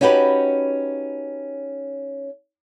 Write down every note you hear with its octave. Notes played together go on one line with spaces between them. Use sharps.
C#4 D#4 F#4 G4 B4